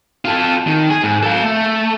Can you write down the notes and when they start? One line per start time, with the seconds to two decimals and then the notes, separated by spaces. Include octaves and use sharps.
0.25 F4 A4
0.67 D#3
0.90 G#4
1.04 G#2
1.23 A4 F5
1.43 A3